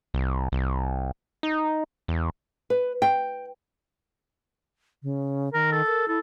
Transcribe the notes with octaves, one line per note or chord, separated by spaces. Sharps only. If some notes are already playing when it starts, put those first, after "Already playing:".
C2
C2
D#4
E2
B4
G5
C#3
D#3 A#4
A4
A#4
E4 A4